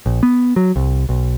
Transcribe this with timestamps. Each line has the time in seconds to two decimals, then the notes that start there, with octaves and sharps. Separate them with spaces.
0.06 A#1
0.23 B3
0.56 F#3
0.76 C2
1.09 B1